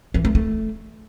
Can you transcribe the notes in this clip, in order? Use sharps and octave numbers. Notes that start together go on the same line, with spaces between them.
E3
A3
A3